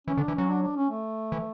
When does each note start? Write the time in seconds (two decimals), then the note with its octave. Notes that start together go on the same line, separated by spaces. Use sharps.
0.07 E3 C#4
0.17 D3
0.21 D4
0.28 E3
0.35 F#3 C#4
0.49 D4
0.63 D4
0.77 C#4
0.90 A3
1.32 E3